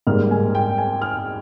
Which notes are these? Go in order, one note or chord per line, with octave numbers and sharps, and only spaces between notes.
G#2 G3 A#3 F6
G#5
G5
G#5
F6